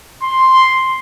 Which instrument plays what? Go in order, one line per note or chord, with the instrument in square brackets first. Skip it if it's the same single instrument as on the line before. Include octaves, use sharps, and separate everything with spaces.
[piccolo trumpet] C6